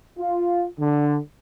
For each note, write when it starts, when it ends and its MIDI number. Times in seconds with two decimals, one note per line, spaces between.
0.19 0.65 65
0.80 1.18 50